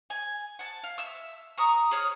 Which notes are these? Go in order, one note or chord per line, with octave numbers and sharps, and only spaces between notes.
G#5
F#5 A5
F5
E5 E6
A#5 C#6 D#6
G#4 C#5 D#6 F6